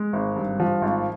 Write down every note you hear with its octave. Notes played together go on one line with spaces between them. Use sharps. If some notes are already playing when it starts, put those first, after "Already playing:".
Already playing: G#3
G#1
G2
F3
G#1